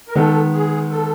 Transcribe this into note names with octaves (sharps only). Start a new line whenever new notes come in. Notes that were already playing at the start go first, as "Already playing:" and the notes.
A#4
D#3 G#3 B3 A4
G#4
A4